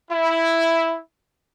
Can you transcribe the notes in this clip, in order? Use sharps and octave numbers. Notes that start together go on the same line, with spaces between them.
E4